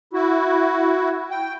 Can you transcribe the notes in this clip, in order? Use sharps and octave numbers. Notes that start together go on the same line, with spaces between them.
E4 F#4
G5